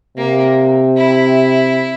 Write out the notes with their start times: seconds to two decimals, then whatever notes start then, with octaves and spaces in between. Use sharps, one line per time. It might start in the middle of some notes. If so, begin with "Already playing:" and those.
0.17 C3 A#3
0.97 E4